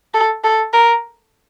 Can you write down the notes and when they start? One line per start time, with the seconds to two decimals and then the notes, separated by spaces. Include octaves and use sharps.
0.14 A4
0.44 A4
0.73 A#4